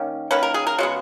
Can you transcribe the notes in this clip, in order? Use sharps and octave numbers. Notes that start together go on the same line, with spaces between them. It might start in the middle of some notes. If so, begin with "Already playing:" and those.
Already playing: D#3 A#3 C#4
D#3 A#3 C#4 B4
A#4
G#4
A#4
C#3 G#3 B3 F#4